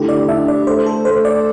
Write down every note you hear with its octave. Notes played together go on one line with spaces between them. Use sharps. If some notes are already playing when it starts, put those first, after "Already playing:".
Already playing: D3 A3 E4 G4
D5
D4 E5
D5
A3 C5
A4
A3 C5
D5